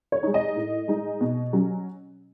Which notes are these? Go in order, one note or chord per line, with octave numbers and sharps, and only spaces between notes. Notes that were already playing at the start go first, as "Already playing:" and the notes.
C#5
G#3 D#4
D#5
A2
G#3 D#4
B2
F#3 C#4